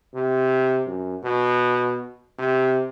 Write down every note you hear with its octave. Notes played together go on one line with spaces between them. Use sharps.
C3
F#2
B2
C3